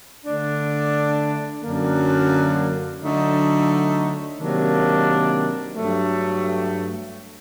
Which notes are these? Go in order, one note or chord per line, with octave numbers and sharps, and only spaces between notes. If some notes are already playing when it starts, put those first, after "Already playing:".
D3 A3 D4
F#2 D3 F#3 A#3 D4
D3 F#3 A3 D#4
C3 D#3 F#3 A#3 D4
G2 F#3 A3